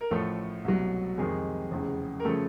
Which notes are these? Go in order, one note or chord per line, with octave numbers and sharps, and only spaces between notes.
A#4
A1 A2 F3 A3 A4
C2 B2 F#3
F2 C3 D#3 G#3 G#4
F1 E2 C#3
A#4
C#3 F3 A3 A4